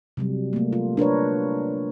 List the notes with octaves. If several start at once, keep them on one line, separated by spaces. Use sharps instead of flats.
C3 F#3 G3
A3 A#3
F4
D4 A#4 B4 C#5